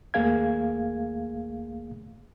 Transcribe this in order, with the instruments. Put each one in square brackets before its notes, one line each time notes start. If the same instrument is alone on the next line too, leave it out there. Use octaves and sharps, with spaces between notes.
[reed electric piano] D#2 A3 A#3 G#4 F5 G#6